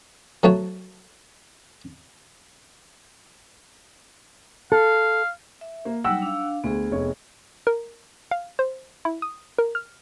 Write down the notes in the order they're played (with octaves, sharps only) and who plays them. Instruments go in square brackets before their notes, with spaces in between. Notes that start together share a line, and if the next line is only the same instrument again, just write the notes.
[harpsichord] F#3 A3 F#4 C#5
[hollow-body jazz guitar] A4 [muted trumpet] F5
[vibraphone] E5
[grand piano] A#3
[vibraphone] F#3 G3 D#4 [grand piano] F#5 G5 E6
[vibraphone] D4 F5
[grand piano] D2 [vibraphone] B3 G#4
[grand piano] F1 C#5
[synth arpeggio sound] A#4
F5
C5
E4
D#6
A#4
F6